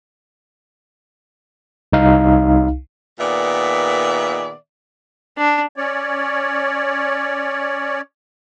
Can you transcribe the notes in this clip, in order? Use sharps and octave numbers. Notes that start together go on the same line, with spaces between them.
C2 D#4 F5
A#2 D#3 B3 G#4 D5 E5
D4
C#4 C#5 D5